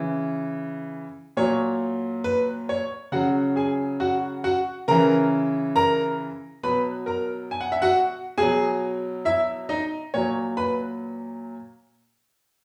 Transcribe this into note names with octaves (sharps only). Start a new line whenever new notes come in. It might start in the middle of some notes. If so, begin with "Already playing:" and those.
Already playing: C#3 E3
A#2 F#3 C#5
B4
C#5
C#3 F#3 F#4 F#5
G#4 G#5
F#4 F#5
F#4 F#5
C#3 E3 A#4 A#5
A#4 A#5
B2 F#3 B4 B5
A#4 A#5
G#5
F#5
E5
F#4 F#5
B2 F#3 G#4 G#5
E4 E5
D#4 D#5
A#2 F#3 C#5
B4 B5